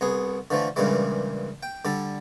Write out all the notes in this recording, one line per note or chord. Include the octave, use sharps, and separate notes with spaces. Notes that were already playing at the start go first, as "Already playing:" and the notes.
C2 B3 G#4
D3 E3 F3 A3
G2 A#2 C#3 E3 G3 G#3
G5
D3 G3 A4